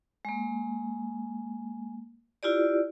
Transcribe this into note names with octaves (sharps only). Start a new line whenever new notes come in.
G#3 A#3
E4 F4 G4 D5